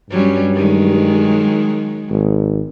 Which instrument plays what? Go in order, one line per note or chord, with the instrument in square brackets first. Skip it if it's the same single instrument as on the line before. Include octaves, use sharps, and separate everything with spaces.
[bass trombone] G2 [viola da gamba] F#3 G3 C#4
[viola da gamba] D#3 F#3 G#3
[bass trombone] G#1